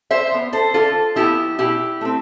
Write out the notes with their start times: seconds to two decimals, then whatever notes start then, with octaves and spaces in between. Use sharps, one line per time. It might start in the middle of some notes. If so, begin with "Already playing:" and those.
0.11 C5 E5
0.32 F3 B3
0.53 A4 C5
0.74 D3 F4 A4
1.16 F3 B3 E4 G4
1.58 B2 E4 G4
2.01 A3 C4